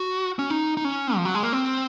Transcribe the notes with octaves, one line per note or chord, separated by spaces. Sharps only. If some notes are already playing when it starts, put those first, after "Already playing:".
Already playing: F#4
C#4
D#4
D#4
C#4
F3
F#3
G#3
A#3
C4